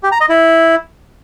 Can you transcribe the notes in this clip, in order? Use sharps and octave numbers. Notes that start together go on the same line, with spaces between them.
G4
A#5
D#5
E4